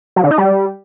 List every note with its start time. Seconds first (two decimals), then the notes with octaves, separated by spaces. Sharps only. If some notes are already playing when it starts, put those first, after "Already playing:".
0.16 F#3
0.24 D3
0.31 D#4
0.38 G3